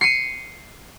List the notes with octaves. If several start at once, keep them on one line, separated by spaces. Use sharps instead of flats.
C7 C#7 D#7